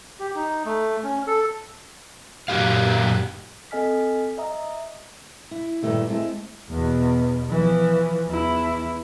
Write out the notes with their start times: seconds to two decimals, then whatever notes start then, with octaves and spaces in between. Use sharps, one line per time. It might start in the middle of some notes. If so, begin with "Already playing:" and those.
0.19 G4
0.35 D#4
0.65 A3
1.03 C#4
1.27 A4
2.48 F#2 A#2 G3 F#4 G4 F5
3.71 C4 A4 D#5 G#5 F6 B6
4.38 D#5 E5 A#5 D#6
5.51 E4
5.82 G2 A#2 D3 D#3 A3 E4
6.08 G#3 A3 C4 E4
6.70 E2 B2
7.49 E3 F3
8.28 E2 E4